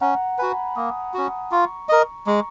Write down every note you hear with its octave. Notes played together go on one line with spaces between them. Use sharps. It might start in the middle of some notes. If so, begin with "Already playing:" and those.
C#4 F#5 A#5
F#4 B4 G#5 B5
A#3 B5 D#6
C#4 F#4
F4 A#5 C#6
A#4 D#5
G#3 A#5 C#6